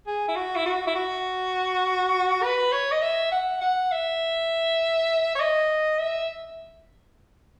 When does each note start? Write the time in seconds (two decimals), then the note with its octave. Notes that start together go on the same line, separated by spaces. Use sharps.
0.06 G#4
0.28 E4
0.35 F#4
0.56 E4
0.66 F#4
0.87 E4
0.95 F#4
2.43 B4
2.72 C#5
2.92 D#5
3.02 E5
3.32 F#5
3.61 F#5
3.92 E5
5.35 C#5
5.40 D#5
5.99 E5